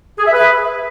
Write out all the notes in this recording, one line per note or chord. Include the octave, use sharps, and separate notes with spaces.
G#4
E5
B4